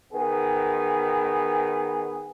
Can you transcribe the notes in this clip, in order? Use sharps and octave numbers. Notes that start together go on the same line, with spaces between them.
D#3 B3 G#4